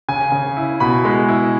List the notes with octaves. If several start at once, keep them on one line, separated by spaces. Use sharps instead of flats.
C#3 G#5
C#3
E4
B2 B5
G#3
E4